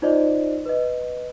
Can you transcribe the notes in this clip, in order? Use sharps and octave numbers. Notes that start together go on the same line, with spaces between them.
D#4 F4 C5 D5 D#5
B4 D#5